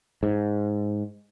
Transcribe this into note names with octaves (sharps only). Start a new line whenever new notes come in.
G#2